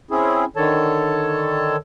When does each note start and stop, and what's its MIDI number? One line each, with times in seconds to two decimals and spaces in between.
0.11 0.45 60
0.11 0.45 61
0.11 0.45 64
0.11 0.45 68
0.56 1.76 50
0.56 1.76 51
0.56 1.76 69
0.56 1.76 73
0.56 1.76 81